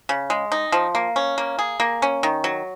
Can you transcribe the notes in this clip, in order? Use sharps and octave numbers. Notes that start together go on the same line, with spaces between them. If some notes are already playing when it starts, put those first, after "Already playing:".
C#3
G#3
D#4
F3
A#3
C#4
A#3
G#4
A#3
C#4
D#3
F#3